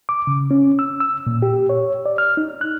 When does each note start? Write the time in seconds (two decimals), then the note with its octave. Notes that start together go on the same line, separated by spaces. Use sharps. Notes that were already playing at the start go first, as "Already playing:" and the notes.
0.09 D6
0.27 C#3
0.51 C#4
0.79 E6
1.00 E6
1.27 A#2
1.42 G4
1.69 C#5
2.06 D5
2.18 F6
2.37 D#4
2.61 F#6